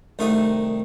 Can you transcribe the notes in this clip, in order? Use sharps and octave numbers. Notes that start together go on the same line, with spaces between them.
C2 D#3 A3 D#4